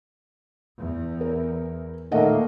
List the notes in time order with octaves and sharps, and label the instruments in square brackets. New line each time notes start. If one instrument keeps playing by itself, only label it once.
[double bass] E2
[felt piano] A#4
[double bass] A#2 [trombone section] D#3 A3 A#3 [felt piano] D#5 F#5